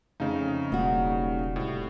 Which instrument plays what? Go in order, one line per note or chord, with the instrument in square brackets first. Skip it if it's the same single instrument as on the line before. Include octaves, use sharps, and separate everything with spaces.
[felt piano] F2 A3 F5 [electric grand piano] C#3 D#4
[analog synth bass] E1 [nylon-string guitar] G3 F#4 [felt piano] A#3
[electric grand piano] A2 [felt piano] C3